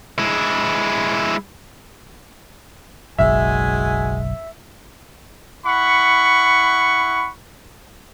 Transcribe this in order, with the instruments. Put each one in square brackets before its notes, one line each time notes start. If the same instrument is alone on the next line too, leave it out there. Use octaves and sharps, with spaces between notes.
[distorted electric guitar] G#3 E4
[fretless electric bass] F#1 B1 [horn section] G#3 F#4 G#5 [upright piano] E5
[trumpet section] E4 F#5 B5 C#6